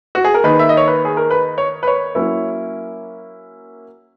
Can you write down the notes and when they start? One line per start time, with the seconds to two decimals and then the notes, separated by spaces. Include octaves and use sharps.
0.15 F#4
0.25 G#4
0.34 A#4
0.44 D#3 A#3 D#4 B4
0.59 E5
0.69 D#5
0.77 C#5
0.87 B4
1.05 G#4
1.17 A#4
1.30 B4
1.58 C#5
1.83 B4
1.87 C#5
2.15 F#3 A#3 C#4 E4